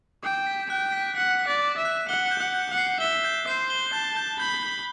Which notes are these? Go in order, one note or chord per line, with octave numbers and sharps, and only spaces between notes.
G5 D6
B6
G5 F#6
B6
F#5 B6
B6
D5
D6
E5
F#6
F#5 G7
G6
F#5
G6
F#5
C7
E5 G7
G6
C5 C7
G7
A5 G6
G6
B5 G6
G6